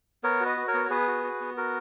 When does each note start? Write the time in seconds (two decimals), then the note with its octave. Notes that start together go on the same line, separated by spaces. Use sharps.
0.24 B3 A#4 C#5
0.41 F#4
0.46 B4 D#5
0.57 F#4
0.68 A#4 C#5
0.74 B3
0.85 C#5
0.90 B3 G#4 B4
1.08 F#4
1.24 F#4
1.41 B3
1.57 F#4 A#4